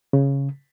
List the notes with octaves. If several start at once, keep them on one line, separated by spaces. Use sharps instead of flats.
C#3